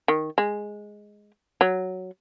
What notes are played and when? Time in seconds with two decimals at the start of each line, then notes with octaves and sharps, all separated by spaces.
0.08 D#3
0.38 G#3
1.61 F#3